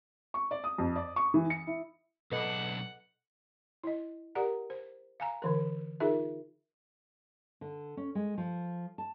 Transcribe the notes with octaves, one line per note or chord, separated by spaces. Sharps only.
C#6
D5
D#6
F2
D5
C#6
E3
C#7
E4
B1 D4 A4 B4 D#5 F#5
E4 D#5
G4 A#4 D5 F#5 A#5
C5
F5 G#5 A#5
D3 E3 A#4
D#4 F4 G#4 A#4 E5
D3
C#4
G#3
F3
A5